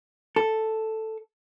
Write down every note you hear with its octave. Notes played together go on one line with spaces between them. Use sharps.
A4